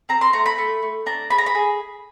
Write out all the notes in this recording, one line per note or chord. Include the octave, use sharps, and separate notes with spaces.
C4 A#5
C6
A3 A#5
B5
A3
A3
D4 A#5
G#4 B5
A#5
B5
G#4